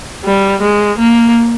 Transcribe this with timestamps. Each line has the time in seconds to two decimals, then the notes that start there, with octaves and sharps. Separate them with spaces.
0.25 G3
0.62 G#3
0.99 A#3